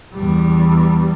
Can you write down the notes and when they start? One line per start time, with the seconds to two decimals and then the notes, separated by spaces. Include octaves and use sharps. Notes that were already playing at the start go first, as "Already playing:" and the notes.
0.14 E2 G3